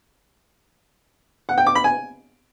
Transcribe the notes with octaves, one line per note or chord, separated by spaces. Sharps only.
F#5
G5
D6
B5
G#5